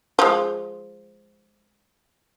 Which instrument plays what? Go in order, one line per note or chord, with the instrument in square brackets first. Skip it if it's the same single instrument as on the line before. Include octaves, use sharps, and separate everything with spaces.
[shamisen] F3 G#3